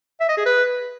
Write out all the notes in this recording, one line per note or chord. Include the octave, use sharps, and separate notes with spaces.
E5
D#5
G#4
B4